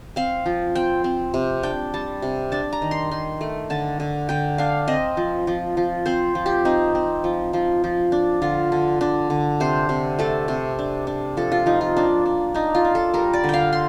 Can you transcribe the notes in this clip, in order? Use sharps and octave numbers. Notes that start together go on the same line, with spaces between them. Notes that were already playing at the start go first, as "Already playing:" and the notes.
C4 F5
F3
C4 G5
C4
C3
D4 G5
G3 A5
C3
D4 A5
A#5
D#3
C6
D#3 C6
A3
D3 A5
D3
D3 G5
D4 F5
C4 D#5
F3
F3
F3
C4 C5
F3
G4
C4 D#4
C4
F3
F3
F3
D4
D3 F4
D3
D3 D4
D3
C3 C5
C3
A3 A4
C3
D4
D4
F3 A4
F4
F3 D#4
F4
A#3 D4
D4
D4 D#4
F4
D4
A4
G3 A#4
D5
D3
F5 G5
C6